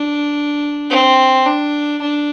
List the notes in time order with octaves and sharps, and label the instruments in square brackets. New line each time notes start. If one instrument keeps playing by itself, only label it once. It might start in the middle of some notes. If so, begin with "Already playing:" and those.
Already playing: [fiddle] D4
C4
D4
D4